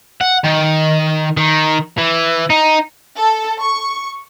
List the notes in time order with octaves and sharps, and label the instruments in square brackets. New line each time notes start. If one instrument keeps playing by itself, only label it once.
[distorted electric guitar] F#5
D#3
D#3
E3
D#4
[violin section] A4
C#6